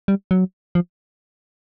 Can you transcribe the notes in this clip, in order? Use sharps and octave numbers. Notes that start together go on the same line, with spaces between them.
G3
F#3
F3